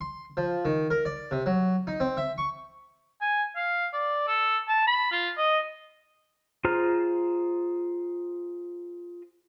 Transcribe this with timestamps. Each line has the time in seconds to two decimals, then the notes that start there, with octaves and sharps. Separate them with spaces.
0.01 C6
0.37 F3
0.65 D#3
0.90 A#4
1.05 D5
1.31 C3
1.46 F#3
1.87 D#4
2.00 C4
2.17 E5
2.38 C#6
3.21 G#5
3.56 F5
3.93 D5
4.27 A4
4.68 A5
4.87 B5
5.12 F4
5.37 D#5
6.65 F4 G#4 C5 A#5 F6